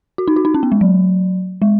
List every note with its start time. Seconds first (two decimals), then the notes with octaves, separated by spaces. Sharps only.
0.18 F#4
0.28 D#4
0.36 F#4
0.45 D#4
0.54 C#4
0.63 B3
0.72 G#3
0.81 F#3
1.62 G#3